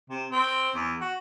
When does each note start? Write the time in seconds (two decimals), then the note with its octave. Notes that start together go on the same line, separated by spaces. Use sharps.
0.10 C3
0.32 C4
0.75 E2
1.01 F#4